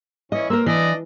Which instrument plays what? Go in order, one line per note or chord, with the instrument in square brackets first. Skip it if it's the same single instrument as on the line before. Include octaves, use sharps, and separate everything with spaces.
[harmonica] E3 C#4 [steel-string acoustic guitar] D#5
[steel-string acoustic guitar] A#3 A#4 [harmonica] C5 E6
[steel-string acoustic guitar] E3 [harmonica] D4 D5 D#5